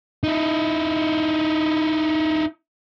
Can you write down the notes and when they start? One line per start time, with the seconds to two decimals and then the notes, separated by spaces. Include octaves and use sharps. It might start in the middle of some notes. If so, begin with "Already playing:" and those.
0.24 D#4 E4